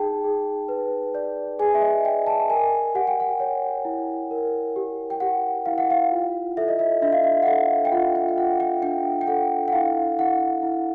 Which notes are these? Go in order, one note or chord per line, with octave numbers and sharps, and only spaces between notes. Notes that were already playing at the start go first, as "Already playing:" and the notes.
Already playing: D#4 G#4 G5 A5
G#4
B4
D5
G#4 G#5
E5
D#5
D5 G5
A5
A#4 G#5
G4 F#5
G5
F#5
C#5
E4
A#4
G4
G5
G4 F#5
E4 F5
F#5
F5
F4
A4 E5
D#5
E5
D4 E5
F5
E5
F#5
A4 F5
G5
F4 F#5
G5
G5
F4 F#5
G5
D4 G5
G5
A4 F#5
F#5
E4 F5
E4 F#5
E4